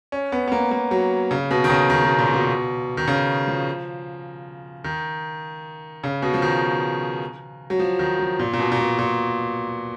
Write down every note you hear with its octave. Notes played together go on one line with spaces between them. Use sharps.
C#4
B3
B3
A#3
A#3
F#3
C#3
B2
D#3
C#3
D#3
B2
A#2
B2
D#3
C#3
F3
D#3
C#3
B2
F3
D#3
F#3
F3
D#3
F3
A#2
A#2
B2
A#2
B2
A#2